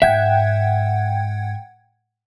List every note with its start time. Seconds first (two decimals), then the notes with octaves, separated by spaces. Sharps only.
0.02 G#2 E5 F#5 G5 G#6